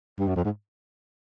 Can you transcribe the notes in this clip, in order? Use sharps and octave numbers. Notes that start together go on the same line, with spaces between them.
G2
F#2
F2
G#2